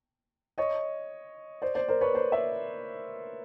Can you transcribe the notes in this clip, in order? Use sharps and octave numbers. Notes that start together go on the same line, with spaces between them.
C#5 D#5
C5 D5
C5 D5
A#4 C5
B4 C#5
C5 D5
D5 E5